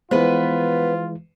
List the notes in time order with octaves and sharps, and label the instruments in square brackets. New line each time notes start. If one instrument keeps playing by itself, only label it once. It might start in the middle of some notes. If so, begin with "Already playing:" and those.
[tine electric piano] E3 G#3 [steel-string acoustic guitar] B3 B4 [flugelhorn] F4 [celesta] C5